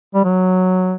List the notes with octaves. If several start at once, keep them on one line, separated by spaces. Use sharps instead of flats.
G3
F#3